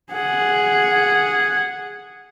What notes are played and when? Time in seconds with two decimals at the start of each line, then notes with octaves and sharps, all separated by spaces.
0.13 G#4 F#5